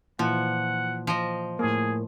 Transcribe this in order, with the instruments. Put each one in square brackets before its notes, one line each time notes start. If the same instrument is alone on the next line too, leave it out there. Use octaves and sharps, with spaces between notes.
[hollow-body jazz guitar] A#2 E3 [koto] F3 [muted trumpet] F#5
[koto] F3 D#5
[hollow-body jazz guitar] A2 A#3 [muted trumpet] G#4